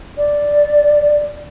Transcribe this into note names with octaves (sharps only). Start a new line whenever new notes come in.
D5